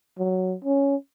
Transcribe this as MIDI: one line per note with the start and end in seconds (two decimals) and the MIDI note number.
0.19 0.56 54
0.65 0.96 61